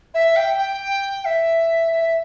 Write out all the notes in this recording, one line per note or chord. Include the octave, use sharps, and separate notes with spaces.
E5
G5
G5
E5
E5